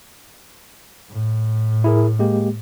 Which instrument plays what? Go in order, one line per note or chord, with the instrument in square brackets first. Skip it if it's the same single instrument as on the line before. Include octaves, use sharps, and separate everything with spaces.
[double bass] A2
[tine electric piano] E4 G#4 A#4
G#3 A#3 G4